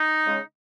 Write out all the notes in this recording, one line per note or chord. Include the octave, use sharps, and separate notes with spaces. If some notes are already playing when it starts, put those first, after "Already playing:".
Already playing: D#4
C#3 G#3